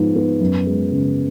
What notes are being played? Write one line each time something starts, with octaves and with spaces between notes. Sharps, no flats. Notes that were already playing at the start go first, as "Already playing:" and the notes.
Already playing: G#2 F3 G#3 B3
B3
F#2
G#3
C#3